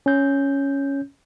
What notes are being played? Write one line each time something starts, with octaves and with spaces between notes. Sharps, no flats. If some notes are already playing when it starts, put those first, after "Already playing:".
C#4 G6